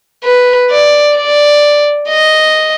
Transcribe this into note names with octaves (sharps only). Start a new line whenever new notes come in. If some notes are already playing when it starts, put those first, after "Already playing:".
B4
D5
D5
D#5